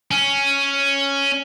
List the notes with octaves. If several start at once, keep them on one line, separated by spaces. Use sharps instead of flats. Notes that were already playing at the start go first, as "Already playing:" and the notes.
C#4